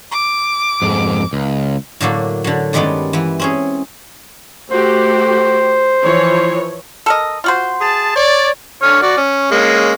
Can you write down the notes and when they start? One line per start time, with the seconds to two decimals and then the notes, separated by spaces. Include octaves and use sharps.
0.11 D6
0.82 F2 G#2
1.33 C#2
2.00 A2 D3 F#3 A#3
2.44 D3 F#3
2.73 G2 D#3 G3 G#3 B3 C#4
3.13 E3 B3
3.39 C4 C#4 G#4
4.70 A3 F#4 G4 C5
6.03 E3 F3 C#5
7.06 A4 A#4 D#5
7.44 F4 F#4 C5
7.81 G#4 A5
8.16 C#5 D5
8.82 D3 C#5 F6
9.02 F#4 D5
9.17 C#4
9.51 G#3 A#3 C#4